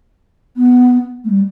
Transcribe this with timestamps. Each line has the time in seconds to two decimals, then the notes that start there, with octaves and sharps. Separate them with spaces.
0.57 B3
1.24 A3
1.30 G3